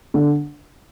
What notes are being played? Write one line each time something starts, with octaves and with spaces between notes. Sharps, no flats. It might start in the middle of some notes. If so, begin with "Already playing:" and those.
D3